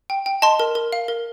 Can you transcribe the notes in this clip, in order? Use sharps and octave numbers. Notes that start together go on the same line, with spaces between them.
G5
G5
D#5 A5 C6
A#4
A#4
F5
A#4